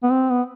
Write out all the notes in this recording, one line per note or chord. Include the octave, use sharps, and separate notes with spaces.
B3
C4
B3